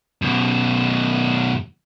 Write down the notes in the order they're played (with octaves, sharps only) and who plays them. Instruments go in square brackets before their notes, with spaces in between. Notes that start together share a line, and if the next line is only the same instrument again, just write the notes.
[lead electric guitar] F#2 B2